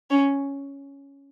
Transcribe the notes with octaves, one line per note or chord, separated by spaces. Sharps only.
C#4